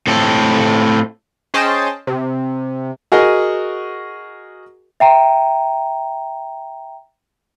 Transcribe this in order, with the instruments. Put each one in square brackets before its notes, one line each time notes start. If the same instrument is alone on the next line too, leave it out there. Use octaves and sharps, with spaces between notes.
[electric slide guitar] A2 C4 A4
[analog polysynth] C#4 G#4 C5 D#5 G5 A5
C3
[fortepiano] F#4 G#4 A#4 D#5
[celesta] E5 G5 A#5